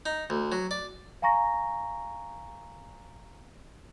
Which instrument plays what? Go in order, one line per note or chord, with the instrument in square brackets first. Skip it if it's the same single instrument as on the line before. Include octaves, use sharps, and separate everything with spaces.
[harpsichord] D#4
D2
F#3
D5
[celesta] F5 G#5 A#5 C#6 A#6